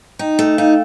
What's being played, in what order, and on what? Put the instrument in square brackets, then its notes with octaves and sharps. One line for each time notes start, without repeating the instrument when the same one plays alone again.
[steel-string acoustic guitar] D#4 [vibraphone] G5
[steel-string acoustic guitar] A3
[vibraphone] G5
[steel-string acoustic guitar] D#4 [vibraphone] F5